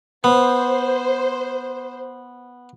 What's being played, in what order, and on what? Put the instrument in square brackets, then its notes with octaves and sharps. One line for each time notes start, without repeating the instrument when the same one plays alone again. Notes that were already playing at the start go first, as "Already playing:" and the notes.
[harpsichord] B3 [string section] C5